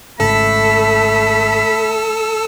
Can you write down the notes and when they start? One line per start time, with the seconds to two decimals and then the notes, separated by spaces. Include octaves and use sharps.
0.20 G#1 G#2 C#3 A3 A4 B5 E6